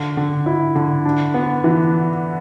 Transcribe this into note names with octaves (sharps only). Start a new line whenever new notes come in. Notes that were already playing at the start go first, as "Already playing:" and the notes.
Already playing: D3
D3
E4
D3
D4
B3
E3